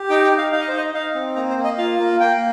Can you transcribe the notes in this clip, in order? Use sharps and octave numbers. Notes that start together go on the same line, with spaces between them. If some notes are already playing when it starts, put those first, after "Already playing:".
Already playing: G4
D#4 G5
G5
D#4
F5
D#4 F5
D#5
C5
D#4 D#5
D#4 F5
C4
A#3 A#5
C5
A#3
D#5
F4 F5
A#3
A#3 G5